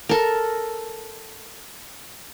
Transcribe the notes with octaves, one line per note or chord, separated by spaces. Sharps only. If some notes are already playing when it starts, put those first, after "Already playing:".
A4 A#4